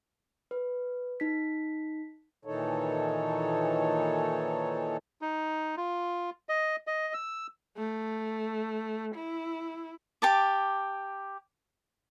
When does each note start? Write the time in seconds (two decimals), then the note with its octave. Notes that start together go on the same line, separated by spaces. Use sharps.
0.51 B4
1.20 D#4 B6
2.45 A#2 D#3 E3 D#4 A4 C#5
5.22 D#4
5.77 F4
6.49 D#5
6.87 D#5
7.14 E6
7.77 A3
9.15 E4
10.22 G4 A5 D6